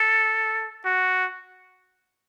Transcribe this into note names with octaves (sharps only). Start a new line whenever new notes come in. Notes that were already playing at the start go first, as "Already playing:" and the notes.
Already playing: A4
F#4